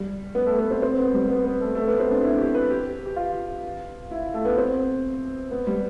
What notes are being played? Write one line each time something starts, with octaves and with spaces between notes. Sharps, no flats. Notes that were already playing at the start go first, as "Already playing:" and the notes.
Already playing: G3
B3
A3
B3
C4
C4
B3
G3
B3
B3
A3
A3
B3
C4
D4
E4
G4
B4
G4
G4
F4
E4
A3
B3
C4
B3
G3